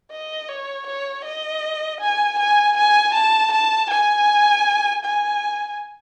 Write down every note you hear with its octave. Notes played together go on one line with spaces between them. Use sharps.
D#5
C#5
C#5
D#5
G#5
G#5
G#5
A5
A5
G#5
G#5